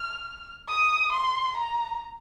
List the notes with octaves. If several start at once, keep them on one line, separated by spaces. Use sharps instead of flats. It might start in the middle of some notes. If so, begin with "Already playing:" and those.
Already playing: F6
D#6
C6
A#5